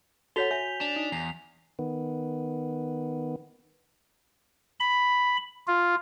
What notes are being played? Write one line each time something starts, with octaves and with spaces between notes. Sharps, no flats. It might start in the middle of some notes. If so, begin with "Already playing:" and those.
F#4 A4 C#5 F#5 B6 F7 G7
E5 G#5 G6
D4 F7
D#4
E2 C7
D#3 B3
B5
F4